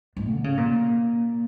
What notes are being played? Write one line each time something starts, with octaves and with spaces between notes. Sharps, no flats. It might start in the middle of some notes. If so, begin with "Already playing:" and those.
G#2
D3
C#3
A#2